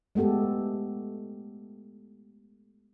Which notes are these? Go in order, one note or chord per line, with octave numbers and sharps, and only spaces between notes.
G#3 A3 B3 G4 A4